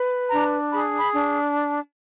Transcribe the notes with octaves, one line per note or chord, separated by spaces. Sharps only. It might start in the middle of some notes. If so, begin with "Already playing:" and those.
Already playing: B4
D4 A#5
G#4 B5
B5
D4